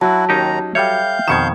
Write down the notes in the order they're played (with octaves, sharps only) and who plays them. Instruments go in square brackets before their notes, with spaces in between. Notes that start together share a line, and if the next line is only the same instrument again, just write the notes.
[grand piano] F#3 [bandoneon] E4 F#4 [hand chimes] A5
[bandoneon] D#2 D#3 A#5 [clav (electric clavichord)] C#4 D#4 G4
[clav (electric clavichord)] G3 A4 C#5 [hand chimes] E5 G5 [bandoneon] F5 G6
[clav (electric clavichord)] F2 B2 D#3 [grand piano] G#6 C#7 E7